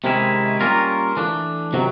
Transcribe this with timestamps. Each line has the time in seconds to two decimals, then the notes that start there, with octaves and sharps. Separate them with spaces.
0.04 C3 D#3 G#3 C#4 E4
0.60 G3 A#3 C#4 F4 A#4
1.17 E3 A3 D4
1.73 C3 D#3 F#3